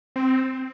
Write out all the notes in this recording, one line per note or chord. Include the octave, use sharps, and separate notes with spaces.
C4